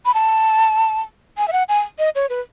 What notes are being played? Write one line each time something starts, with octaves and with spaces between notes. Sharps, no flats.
B5
A5
G#5
E5
F#5
G#5
D#5
C#5
B4